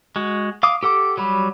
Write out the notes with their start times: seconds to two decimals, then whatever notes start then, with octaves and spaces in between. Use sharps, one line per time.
0.16 G#3 F#4
0.63 F5 D6 D#6
0.83 G4 A4 F#5 D6
1.17 F#3 G3 B5